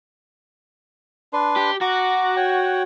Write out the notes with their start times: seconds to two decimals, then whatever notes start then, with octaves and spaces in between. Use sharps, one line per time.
1.33 D4 B4 C6
1.57 G4
1.81 F#4 F#5 A#5 D6
2.37 C#5 F#5 G5